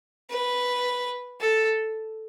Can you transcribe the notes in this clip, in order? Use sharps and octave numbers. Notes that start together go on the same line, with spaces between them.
B4
A4